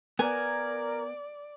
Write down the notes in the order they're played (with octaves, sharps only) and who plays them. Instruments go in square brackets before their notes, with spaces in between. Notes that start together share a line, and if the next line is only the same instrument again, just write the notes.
[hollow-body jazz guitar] B3 [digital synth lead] A#4 [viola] D5 [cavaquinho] G#5